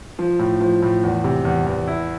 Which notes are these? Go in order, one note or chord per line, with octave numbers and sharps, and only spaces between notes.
F3
A2
F3
A2
E2
C3
E2
E2
E4